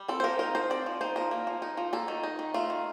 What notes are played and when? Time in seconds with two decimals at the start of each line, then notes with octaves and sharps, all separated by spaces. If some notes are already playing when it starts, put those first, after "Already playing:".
Already playing: G3
0.08 C4 A4
0.20 C5
0.24 F3 A#4
0.39 D#4 A#4
0.55 F3 C5
0.70 C4 D5
0.86 F3
1.01 D#4 C5
1.16 F3 A#4
1.31 A#3
1.47 F3
1.62 D#4
1.77 F3
1.93 A#3 A4
2.08 D#3
2.23 D#4
2.39 D#3
2.54 A3 F4
2.70 D#3